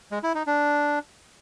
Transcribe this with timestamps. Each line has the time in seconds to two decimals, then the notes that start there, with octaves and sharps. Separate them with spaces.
0.11 G#3
0.23 E4
0.35 D#4
0.47 D4